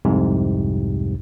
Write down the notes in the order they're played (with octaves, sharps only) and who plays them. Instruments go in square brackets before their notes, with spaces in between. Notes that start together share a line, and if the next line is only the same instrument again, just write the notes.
[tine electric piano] C2 F2 G#2 C3